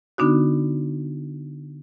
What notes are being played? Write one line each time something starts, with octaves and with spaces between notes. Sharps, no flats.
D3 B3 D4 D#4 F#4